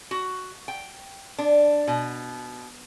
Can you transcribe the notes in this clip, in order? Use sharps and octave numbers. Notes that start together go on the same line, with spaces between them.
F#4
G5
D4
B2